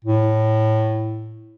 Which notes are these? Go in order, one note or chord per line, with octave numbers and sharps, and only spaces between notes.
A2